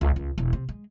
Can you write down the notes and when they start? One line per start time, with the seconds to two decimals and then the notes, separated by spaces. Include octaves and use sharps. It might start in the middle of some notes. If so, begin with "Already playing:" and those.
0.01 C#2
0.16 C#2
0.38 E1
0.53 C3
0.69 G#3